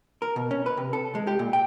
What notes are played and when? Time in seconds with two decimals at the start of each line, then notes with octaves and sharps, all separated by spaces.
0.22 A#4
0.36 B2
0.51 C#4
0.66 B4
0.77 C3
0.93 A4
1.15 G#3
1.27 G4
1.39 A#2
1.53 G5